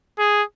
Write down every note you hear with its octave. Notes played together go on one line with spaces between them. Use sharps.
G#4